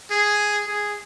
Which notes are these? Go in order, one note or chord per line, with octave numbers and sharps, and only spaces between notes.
G#4
G#4